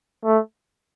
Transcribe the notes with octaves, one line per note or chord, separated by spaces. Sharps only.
A3